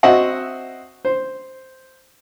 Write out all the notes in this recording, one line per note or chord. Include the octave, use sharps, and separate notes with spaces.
C4 F#4 D#5 E5 F#5
C5